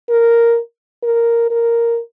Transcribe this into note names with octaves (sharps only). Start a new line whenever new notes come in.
A#4
A#4
A#4